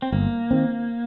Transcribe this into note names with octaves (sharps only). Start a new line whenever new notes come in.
C4
G1 A#3
D#3 C4